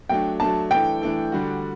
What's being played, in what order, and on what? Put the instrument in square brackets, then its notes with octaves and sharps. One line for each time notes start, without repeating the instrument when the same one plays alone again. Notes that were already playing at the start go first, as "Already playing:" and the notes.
[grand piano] F#3 A3 D4 [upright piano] G5
[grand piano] F#3 A3 D4 [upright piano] A5
[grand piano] E3 A3 D4 A4 [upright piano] G5
[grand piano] E3 A3 D4 A4
D3 G3 D4 F#4